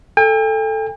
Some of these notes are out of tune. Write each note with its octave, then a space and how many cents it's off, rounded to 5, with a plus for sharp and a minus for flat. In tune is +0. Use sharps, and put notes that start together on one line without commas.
A4 +0 G5 +45